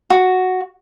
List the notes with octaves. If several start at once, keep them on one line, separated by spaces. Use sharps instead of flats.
F#4